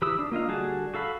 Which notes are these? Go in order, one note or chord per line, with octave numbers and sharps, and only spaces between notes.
E3 G4 B5 D#6 E6
D4
A#3 F4 D#5 F5
D3 G3 F#4 G#4 A5
F#4 A4 F5 B5